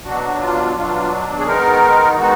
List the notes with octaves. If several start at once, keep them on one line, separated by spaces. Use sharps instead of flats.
B2 F#3 D4 F#4
F4
B2 F#3 D4 F4
G#4
D#3 G#3 B3 D#4 A#4
D#3 G#3 B3 D#4 F#4